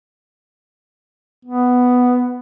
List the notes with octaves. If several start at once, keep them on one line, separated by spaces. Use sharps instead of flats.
B3